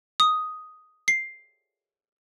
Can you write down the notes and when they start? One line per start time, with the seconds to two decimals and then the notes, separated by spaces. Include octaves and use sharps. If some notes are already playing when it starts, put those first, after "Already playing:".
0.20 D#6
1.08 C7